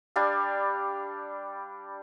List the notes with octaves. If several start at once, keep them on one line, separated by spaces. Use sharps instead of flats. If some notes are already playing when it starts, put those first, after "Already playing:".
G3 D4 F5